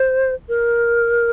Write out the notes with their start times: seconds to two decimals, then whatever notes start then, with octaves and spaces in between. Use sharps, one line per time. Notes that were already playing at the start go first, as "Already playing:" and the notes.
Already playing: C5
0.49 A#4